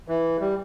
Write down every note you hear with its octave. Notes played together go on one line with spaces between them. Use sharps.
E3
G3